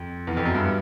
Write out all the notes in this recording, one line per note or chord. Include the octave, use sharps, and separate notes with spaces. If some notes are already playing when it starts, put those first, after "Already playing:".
Already playing: F2
E2
F2
F#2
G2